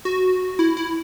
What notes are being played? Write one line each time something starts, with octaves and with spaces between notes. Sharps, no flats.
F#4
E4
E4